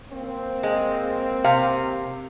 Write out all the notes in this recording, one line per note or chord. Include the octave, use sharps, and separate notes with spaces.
A#3 C4
G#3
C3 F5